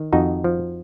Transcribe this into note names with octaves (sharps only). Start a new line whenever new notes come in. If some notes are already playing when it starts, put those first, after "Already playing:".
Already playing: D#3
F2 D#4 F#4
F3